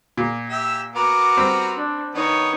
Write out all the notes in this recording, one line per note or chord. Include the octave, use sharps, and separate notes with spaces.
A#2
G4 E5 E6
B3 F#4 A#4 D6
G3 C4
D4
D#3 B3 D#4 C#5